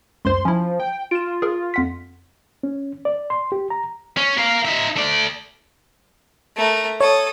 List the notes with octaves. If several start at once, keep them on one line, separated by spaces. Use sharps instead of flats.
C#2 F#2 C5 C6
F3 C#4 E4
G5
F4 D7 E7
G#4 A#4
F2 F#5 B6
C#4
D5
C6
G4
A#5
C#4
A#4 F5
D#4 E5
A3 D5
A3 A#4
A4 C#5 D#6